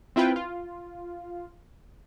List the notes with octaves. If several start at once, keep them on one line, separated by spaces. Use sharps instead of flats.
C4 E4 F4 B4 G5
F4